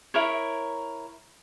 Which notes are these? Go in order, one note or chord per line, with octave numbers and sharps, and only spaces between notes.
E4 A#4 C#5